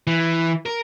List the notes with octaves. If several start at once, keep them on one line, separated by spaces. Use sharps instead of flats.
E3
A#4